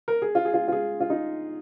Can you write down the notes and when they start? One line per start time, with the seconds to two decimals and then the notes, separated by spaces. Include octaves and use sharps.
0.08 A#4
0.22 G#4
0.35 F4
0.45 G#4
0.54 F4
0.68 F4
0.72 G#4
1.00 F4
1.10 D#4